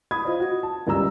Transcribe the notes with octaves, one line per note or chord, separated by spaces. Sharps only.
B5 D#6 G#6
F4 C5 D#5
F#4
A5
F#1 C#2 G3 A#5 E6